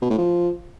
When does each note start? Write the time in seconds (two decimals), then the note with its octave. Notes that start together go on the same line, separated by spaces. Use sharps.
0.02 B2
0.10 A2
0.18 F3